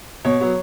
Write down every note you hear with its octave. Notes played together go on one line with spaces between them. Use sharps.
B2 C#5
F#3 B3